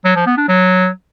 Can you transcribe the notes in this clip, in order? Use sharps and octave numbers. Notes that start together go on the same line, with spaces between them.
F#3
F3
B3
D4
F#3